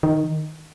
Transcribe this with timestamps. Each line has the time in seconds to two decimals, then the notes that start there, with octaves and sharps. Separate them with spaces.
0.03 D#3